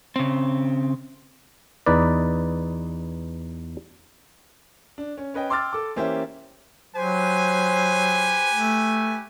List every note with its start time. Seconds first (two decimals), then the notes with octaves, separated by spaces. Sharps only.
0.16 C#3 C4
1.86 E2 D#4 B4 D5
4.98 D4
5.18 C#4
5.34 C#4 B4 D#5 G5
5.49 G5 C6 D6 E6 F6 A6
5.73 A4 D6
5.96 E3 A#3 C#4 G4 C5 E5
6.95 F#3 G4 B4 C5 G#5
8.53 A3